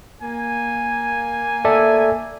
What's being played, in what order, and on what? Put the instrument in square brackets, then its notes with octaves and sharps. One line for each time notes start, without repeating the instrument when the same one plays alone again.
[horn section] A#3 G#5
[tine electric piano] A4 D5 E5